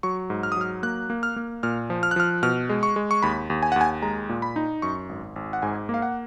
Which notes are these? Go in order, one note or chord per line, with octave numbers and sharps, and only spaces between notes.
F#3 C#6
G#2
F6
D#6
F#3 F6
A#3 F#6
A#3
F6
A#3
A#2 F6
F3
F6
F#6
F3 F6
B2 F6
G#3
C#6
G#3
C#6
D#2 B5
D#2
G#5
F#5
D#2
G#5
G#3 A#5
A#2
B5
D#4
F#2 C#6
G#1
G#1
F#5
G#2 G#5
A#3
F5
F#5